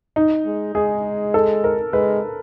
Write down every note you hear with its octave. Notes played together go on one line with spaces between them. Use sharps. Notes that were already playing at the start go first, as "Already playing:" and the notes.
D#4
G#3
G#3 G#4
A4
A#4
G#3 B4